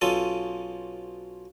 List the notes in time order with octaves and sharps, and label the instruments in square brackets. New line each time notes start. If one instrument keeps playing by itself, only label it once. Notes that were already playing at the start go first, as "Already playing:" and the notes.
[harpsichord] B1 C#4 F4 A4 D#6